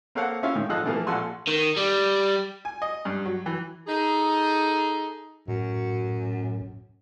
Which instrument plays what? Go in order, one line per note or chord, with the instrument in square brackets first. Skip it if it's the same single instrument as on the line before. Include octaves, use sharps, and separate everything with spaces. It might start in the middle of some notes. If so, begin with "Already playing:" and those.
[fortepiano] A#3 C4 A4 C#5 F5 F#5
C#4 E4 F4 C#5 E5 F5
A2 D#3
G#1 F3 F4 A4 D#5 F#6
E3 F3 A3 A#3
A#1 F4 A4 F#5 G#5 C6
[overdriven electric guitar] D#3
G3
[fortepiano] G#5
D#5
G2
F#3
E3
[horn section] D#4 G#4 A4
[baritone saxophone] F#2 [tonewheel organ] A2